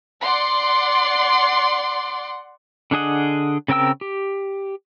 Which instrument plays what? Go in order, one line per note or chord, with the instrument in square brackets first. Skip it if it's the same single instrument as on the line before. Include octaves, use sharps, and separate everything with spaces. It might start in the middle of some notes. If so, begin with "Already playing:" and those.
[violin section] D5 F#5 C6
[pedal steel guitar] D3 D4 G#4 D#5 F#5
C#3 C4 A#4 G5 E6
G4